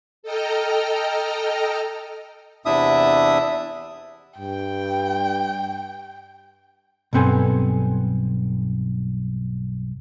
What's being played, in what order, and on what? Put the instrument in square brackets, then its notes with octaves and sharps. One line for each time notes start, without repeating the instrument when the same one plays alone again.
[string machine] A4 D#5 G5 A#5 F6
[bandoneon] E2 C3 D4 E4 E5 D#6
[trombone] G2 [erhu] G5
[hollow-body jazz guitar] B1 G2 B3 C4 A4 G#5